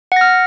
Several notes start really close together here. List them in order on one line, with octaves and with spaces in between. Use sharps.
F#5 A#6 F6